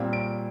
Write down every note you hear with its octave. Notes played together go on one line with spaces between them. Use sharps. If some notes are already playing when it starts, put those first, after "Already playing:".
Already playing: A#2 G3 C4
D7